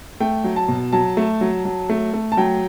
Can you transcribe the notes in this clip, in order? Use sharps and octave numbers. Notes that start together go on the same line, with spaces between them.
A3 G5
F#3
A5
B2
F#3 A5
A3
F#3
F#3
A3
A3
A5
F#3 G5